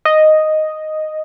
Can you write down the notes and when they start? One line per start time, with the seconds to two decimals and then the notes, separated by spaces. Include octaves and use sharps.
0.05 D#5